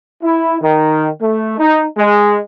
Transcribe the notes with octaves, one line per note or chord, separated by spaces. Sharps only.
E4
D#3
A3
D#4
G#3